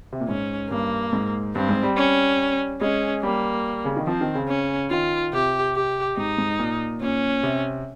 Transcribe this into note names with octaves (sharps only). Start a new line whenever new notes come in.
C3
A#2
G#2 C#4
G2 A#3
G#2
G2 C4
G#2
G3
C#4
G#3 C#4
G3 A#3
C#3
D#3
F3 C4
D#3
C#3
C#4
D#3 F4
C3 G4
G4
G#2 D#4
G#2
A#2
A#2 C#4
C3